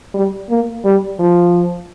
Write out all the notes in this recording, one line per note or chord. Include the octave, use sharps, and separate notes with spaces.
G3
A#3
G3
F3